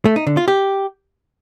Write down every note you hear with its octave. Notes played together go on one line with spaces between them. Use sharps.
A3
D#4
D3
F4
G4